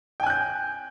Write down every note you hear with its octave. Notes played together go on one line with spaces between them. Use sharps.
G5 G#5 F#6 G6